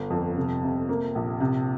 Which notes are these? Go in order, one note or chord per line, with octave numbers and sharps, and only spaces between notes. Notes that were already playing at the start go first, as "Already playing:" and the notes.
Already playing: G1
F2
C3
C3
A#3
A#1
C3